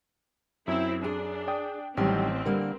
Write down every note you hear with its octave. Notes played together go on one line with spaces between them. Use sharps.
F#2 C4 E4
D4 G#4
D5 G5 D#6
A1 D#3 F#3 G3 C4
D3 G3 A#3 A#4